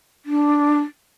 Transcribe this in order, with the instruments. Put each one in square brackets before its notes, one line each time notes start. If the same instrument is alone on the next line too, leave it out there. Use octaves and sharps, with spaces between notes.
[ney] D4